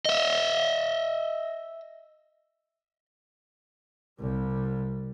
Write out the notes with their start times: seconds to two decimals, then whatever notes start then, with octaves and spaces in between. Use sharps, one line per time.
0.05 D#5 E5
4.20 C2 G3